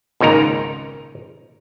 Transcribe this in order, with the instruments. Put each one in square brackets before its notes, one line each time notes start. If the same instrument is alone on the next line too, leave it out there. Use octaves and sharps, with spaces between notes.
[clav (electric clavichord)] G#1 C#2 A#2 D#4 A#4